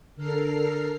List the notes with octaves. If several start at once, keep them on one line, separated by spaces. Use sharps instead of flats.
D3 A4 A#4 F6 C7